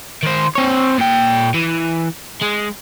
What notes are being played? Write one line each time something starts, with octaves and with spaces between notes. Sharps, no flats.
D#3 C5
C4 C#5
A#2 G5
E3
G#3